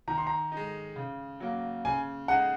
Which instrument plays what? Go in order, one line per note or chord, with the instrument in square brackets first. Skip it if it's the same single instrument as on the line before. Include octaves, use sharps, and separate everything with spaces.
[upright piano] D#3 [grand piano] A#5
[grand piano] C6
A#5
[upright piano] G#3 D#4
C#3
F#3 A#3
[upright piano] C#3 [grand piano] G#5
[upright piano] G#3 D#4 [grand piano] F#5